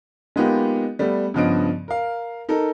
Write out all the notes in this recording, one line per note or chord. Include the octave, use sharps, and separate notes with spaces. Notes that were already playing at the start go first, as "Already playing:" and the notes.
G#3 A#3 B3 D#4 F4 G4
G3 A3 B3
G2 C#3 F3 B3 D#5 D7
A#4 F5
D#4 A4 A#4